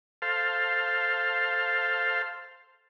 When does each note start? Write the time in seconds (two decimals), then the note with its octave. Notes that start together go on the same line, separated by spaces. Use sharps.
0.22 A4 C5 F5